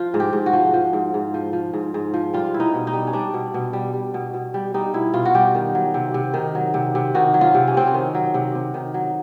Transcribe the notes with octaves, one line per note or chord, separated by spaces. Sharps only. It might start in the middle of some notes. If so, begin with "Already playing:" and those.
Already playing: F3 F4
G#2
G4
G#2
F#4
F3
F3
G#2
G#2
F3
F3
G#2
G#2
F3
G3 F4
B2 E4
D#4
B2
D#4
G3
C#4
G3 D4
B2
B2
G3
G3
B2
B2
G3
G3 D#4
B2 E4
B2 F4
F#4
G3 G4
D#3
F#3
C3
C3
D#3
F#3
C3
C3
D#3 F#4
F#3
F4
C3
C#4
C3 C4
C#4
D#3
F#3
C3
C3
D#3
F#3